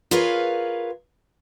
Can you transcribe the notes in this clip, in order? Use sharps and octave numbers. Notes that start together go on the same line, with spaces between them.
F4 G#4 A#4 B4 C#5 F5